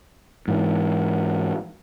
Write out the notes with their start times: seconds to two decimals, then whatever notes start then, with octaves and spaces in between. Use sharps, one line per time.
0.48 G#2 E3